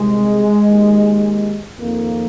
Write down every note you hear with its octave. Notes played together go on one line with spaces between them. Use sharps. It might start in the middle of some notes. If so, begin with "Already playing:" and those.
Already playing: C2 C3 D#3 G#3
D#2 D#3
F2 D#3 A#3